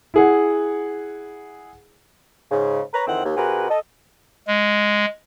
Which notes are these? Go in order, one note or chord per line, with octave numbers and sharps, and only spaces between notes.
E4 G#4 F#5
G#2 C#3
B4 C#5 A#5
F2 D#3 E3 C4 F#5
D#2
C3 F#4 G#4 A#4 B4
A4 D#5
G#3